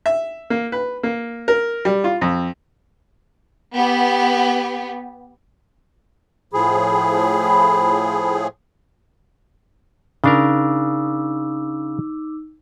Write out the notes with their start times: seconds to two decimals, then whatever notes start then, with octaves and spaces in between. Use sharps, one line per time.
0.06 E5
0.50 A#3
0.72 B4
1.03 A#3
1.48 A#4
1.85 G3
2.04 F4
2.21 F2
3.74 B3 G4
6.53 A2 F3 G#4 B5
10.24 C#3 D4 D#4 A#4 D6 E6